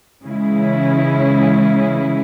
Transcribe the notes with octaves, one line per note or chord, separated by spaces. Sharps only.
C#3 E3 G#3 C#4 E4